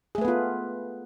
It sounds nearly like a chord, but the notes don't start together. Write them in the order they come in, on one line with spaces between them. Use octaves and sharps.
G#4 A3 B4 B3 F4